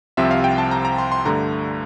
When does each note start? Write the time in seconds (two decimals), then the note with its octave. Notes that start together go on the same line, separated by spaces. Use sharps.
0.17 C2 C3 F3 C4 E5
0.31 F5
0.44 G5
0.58 A5
0.71 A#5
0.85 A#5
0.98 C6
1.12 C6
1.25 G2 D3 A3 A#5